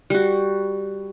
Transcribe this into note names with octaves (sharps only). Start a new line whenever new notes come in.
G3 F#4